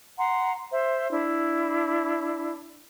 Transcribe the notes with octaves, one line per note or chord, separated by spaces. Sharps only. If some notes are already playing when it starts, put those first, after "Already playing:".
F#5 A#5 C6
C5 E5
D4 E4